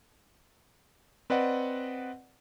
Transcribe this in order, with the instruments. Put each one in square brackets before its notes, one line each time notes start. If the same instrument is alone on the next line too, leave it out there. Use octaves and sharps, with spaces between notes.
[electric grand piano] C4 B4 D5 D#5 F#5